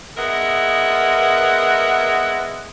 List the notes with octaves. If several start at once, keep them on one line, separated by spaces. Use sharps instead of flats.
G#3 B3 A#4 E5 F#5